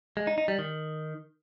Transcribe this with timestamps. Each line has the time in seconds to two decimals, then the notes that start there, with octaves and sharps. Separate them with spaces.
0.17 G#3
0.27 D#4
0.38 D#4
0.48 G3
0.59 D#3